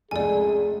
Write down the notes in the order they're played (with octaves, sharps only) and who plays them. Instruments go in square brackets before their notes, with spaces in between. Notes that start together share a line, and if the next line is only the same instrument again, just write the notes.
[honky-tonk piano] F1 C#2 [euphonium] G#4 [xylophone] D5 G#5